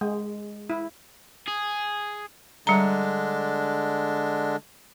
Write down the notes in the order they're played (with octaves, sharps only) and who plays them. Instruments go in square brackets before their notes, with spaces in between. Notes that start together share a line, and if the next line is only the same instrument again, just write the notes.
[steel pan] G#3
E4
[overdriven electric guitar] G#4
[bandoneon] D3 G#3 D4 [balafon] G3 A#5